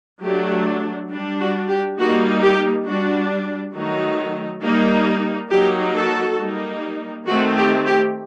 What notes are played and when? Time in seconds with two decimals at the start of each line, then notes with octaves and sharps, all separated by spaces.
0.23 F#3 A3 D4 G4
1.10 G3 D4
1.40 F#4
1.70 G4
1.99 G3 A#3 D#4 F#4
2.43 G4
2.87 G3 D4 F#4
3.74 D#3 F#3 A3 D#4 F#4
4.63 G3 A#3 D#4
5.51 F#3 A#3 D#4 G4
5.95 F#4 A4
6.40 G3 A#3 D#4
7.27 D#3 A3 C4 F#4
7.57 G4
7.86 G4